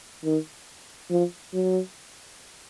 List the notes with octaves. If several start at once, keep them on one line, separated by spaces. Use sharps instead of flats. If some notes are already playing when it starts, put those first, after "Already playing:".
D#3
F3
F#3